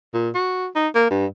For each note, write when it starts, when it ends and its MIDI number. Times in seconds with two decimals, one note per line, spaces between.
0.13 0.30 46
0.35 0.68 66
0.75 0.88 63
0.95 1.10 58
1.10 1.26 43